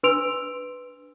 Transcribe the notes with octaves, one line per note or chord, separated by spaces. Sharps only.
D4 B4 C6 E6 D7 F7